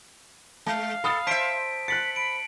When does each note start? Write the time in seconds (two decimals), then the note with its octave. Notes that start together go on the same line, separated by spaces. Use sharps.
0.66 G#3 F5 A5
1.04 A4 B5 D#6 A6
1.27 C5 E5 A5 B6 D7
1.88 F#6 A6 B6 C#7 F#7
2.16 B5 D7